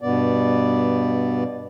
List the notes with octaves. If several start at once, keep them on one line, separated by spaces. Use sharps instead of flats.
G2 B2 B3 D5